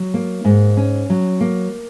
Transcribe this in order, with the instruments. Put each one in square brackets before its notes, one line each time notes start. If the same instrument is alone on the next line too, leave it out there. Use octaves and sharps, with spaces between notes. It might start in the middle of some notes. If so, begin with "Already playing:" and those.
Already playing: [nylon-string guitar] F#3
A#3
G#2
C#4
F#3
A#3